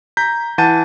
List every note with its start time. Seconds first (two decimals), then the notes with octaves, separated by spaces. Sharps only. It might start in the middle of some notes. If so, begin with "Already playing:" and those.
0.17 A#5 G6 B6
0.58 E3 F#5 A5 G6 A6 D#7